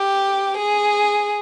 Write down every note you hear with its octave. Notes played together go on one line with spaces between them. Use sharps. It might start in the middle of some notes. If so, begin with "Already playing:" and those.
Already playing: G4
G#4